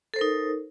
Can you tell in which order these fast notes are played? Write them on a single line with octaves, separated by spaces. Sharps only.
A4 C5 A#4 D#4